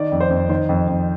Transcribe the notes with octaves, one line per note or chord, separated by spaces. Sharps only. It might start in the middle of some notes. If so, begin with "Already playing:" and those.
Already playing: D#3 D5
F2
C5
F2
D#3 C5
F2
F2